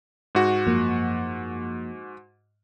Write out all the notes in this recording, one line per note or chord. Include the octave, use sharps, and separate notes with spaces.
G#2 F#4
F#2 F3 A#3